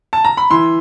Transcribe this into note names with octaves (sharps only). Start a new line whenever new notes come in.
A5
A#5
B5
E3 C6